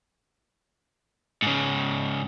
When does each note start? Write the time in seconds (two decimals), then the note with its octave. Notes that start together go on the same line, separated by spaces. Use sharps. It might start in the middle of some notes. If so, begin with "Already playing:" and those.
1.42 G#2 C#3